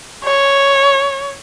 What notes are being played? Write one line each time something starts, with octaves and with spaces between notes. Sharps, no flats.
C#5